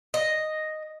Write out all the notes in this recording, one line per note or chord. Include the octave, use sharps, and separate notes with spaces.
D#5